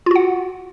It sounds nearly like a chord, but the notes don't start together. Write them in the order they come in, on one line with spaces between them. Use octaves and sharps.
F4 F#4 F#5